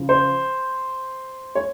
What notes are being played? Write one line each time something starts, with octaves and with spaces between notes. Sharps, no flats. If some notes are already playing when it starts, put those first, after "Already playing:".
Already playing: C#3 F3
C5
C#5